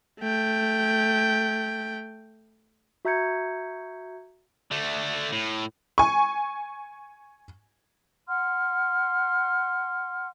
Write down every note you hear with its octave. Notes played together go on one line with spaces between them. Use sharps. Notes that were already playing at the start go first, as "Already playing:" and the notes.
A3 G5
F#4 E5 A#5 G6 G#6 C#7
D3 A3
A2
G#5 C#6
F#5 C6 F6